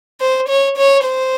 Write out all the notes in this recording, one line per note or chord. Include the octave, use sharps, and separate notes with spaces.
C5
C#5
C#5
C5